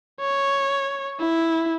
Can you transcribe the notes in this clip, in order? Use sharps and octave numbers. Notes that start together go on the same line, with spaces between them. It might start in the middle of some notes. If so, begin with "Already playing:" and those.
C#5
E4